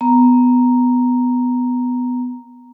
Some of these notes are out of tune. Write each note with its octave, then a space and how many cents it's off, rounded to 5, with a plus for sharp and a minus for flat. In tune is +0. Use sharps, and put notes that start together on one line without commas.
B3 +15 A#5 +0